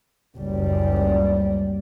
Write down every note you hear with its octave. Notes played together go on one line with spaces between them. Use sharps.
F#1 C#2 G3